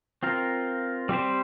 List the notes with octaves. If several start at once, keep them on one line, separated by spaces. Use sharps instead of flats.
C4 F4 A#4
G3 C4 G4 C5